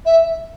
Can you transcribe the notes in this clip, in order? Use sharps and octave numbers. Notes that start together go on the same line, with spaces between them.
E5